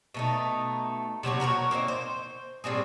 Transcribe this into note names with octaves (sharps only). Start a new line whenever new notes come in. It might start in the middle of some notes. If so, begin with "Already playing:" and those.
B2 A3 D#4
C3 F#3 B3 C#5
F#4 A#4 C5 C#5
A#3 C4 C#4 D#4
C5
A2 G3 C4 G#4